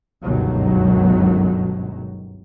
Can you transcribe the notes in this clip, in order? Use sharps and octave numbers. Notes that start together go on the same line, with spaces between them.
G1 C#2 F#2 B2 D#3 F#3